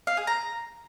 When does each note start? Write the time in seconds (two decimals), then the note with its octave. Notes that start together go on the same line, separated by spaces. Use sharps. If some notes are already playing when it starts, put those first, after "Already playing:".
0.07 F5
0.17 G#4
0.27 A#5